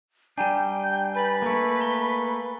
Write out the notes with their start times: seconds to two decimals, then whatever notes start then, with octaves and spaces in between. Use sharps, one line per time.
0.38 G3 D4 G5 G#5 A#5 G6 D#7
1.15 B4 G#5 B5 A6 F#7
1.42 A3 A#3 B5
1.80 A#5 G7